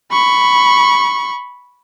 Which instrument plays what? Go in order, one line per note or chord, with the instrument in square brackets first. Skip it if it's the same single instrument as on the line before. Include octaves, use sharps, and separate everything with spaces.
[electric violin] B5 C#6